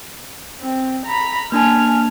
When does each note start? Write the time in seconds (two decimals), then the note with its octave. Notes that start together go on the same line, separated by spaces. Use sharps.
0.62 C4
1.06 A#5 B5
1.52 A#3 D4 G#5 A5 F6